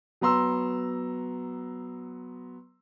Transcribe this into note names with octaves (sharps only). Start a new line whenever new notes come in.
F#3 B3 A#5 C6 E6